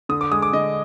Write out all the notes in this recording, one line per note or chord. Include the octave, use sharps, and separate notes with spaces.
D3 D#6
D6
G#3 D#6
D6
D3 D#5